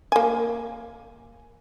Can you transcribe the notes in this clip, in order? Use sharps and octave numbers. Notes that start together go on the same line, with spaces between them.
A#3 G#5